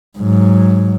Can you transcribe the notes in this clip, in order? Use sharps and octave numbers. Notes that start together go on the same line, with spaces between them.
G#2 F#3